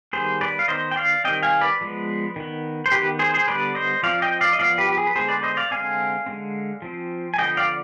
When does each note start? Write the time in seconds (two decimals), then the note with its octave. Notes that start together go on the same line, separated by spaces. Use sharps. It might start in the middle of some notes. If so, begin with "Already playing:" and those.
0.13 D#3 G3 B3 G#4 C5
0.41 B4 D5
0.59 F5
0.68 D#3 B3 C5 D#5
0.91 G5
0.96 D5 F5
1.24 D#3 G3 C4 D#5 G5
1.43 F5 G#5
1.61 B4 D5
1.81 F3 G#3 B3
2.36 D#3 B3
2.86 C5
2.92 D#3 B3 G4 B4
3.19 G#4 C5
3.34 G#4 C5
3.48 D3 G3 B3 B4 D5
3.75 C5 D#5
4.03 F3 C4 D5 F5
4.22 D#5 G5
4.41 D5 F5
4.53 D#5
4.59 F3 B3 D5 F5
4.78 G4 B4
4.89 G4
4.98 G#4
5.07 B4
5.16 D3 G#3 B3 G#4 C5
5.29 B4 D5
5.43 C5 D#5
5.57 D5 F5
5.71 D3 G#3 C4 F5 G#5
6.26 D3 G#3 C4
6.82 F3 C4
7.34 G#5
7.38 D3 F3 B3 D#5 G5
7.57 D5 F5